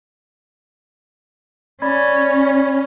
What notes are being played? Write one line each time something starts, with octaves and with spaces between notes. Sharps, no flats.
C#4 D5 B5 G#6